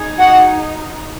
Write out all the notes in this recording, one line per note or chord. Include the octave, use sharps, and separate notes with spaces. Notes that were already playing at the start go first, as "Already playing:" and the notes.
Already playing: D#4 G#4
F#4 F#5